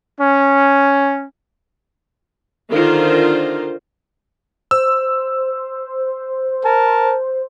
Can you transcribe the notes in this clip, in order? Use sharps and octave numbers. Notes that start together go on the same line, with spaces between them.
C#4
D3 D#3 D4 F4 A#4 C5
C5 E6
A#4 A5